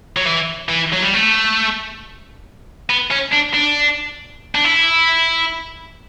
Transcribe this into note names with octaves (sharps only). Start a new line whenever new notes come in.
F#3
E3
E3
F#3
G3
A3
B3
C#4
D4
D4
D4
E4